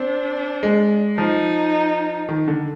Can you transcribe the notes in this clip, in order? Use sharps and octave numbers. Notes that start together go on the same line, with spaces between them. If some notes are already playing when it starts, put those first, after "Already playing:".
Already playing: C4 D4
G#3
F3 D#4
D#3
D3